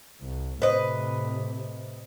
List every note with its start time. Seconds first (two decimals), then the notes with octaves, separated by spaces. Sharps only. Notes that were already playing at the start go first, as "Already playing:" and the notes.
0.21 C2
0.62 A2 C3 B4 C5 D#5